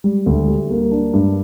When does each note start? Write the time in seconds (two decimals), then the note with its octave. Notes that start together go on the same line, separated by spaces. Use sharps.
0.04 G3
0.26 D2
0.48 G3
0.70 A#3
0.91 D4
1.14 G2